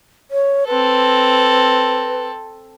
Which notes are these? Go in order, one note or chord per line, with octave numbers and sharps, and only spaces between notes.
C#5
C4 A4 B4